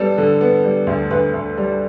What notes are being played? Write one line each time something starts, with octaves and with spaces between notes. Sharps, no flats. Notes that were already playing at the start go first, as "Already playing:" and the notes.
Already playing: G3 B3 A4
D3
B3
G3
D2
D2 B4
D2
G3